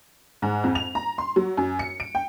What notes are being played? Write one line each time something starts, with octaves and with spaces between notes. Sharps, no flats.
G#2
F2
F7
A#5
C6
F#3
F#2
C#7
D7
G5